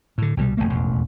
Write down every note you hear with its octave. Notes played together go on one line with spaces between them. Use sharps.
A2 D3
C2 B2 F3 G3
E1 A#1 A3 A#3
E1 A1 F2